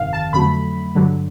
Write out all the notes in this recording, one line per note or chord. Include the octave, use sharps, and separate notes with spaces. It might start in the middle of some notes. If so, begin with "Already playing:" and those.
Already playing: G1 F2 C3 D#3 F5
A5
F2 D3 F#3 A3 B5
G2 D3 F#3